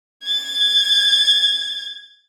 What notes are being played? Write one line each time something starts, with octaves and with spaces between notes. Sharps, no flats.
G#6 A6